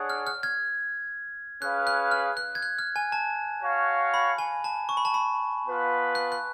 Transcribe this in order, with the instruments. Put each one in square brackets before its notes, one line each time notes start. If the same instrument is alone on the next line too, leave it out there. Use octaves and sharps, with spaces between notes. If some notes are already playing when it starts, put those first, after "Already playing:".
Already playing: [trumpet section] D4 G#4 C#5 F#5
[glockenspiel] F6
F6
F6 G#6
[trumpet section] C#4 G#4 B4 F5 [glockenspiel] F#6
[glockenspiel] F#6
F6
F#6
G#6
F#6
F6
G#5
A5
[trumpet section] F#4 C#5 F5
[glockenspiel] B5
G#5
A5
C#6
B5
A5
B5
[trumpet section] B3 F4 B4
[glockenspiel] F#6
F#6